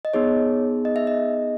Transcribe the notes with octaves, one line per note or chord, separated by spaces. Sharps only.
D#5
B3 D#4 G#4 C#5
D#5
E5
D#5